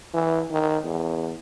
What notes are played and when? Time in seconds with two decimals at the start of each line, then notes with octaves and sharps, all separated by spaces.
0.14 E3
0.51 D#3
0.83 E2